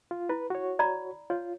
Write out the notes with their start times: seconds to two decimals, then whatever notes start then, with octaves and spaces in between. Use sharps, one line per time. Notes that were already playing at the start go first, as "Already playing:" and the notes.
0.11 F4
0.29 E4 B4
0.50 F#4 C#5
0.79 D5 A#5 B5
1.30 F4 C#5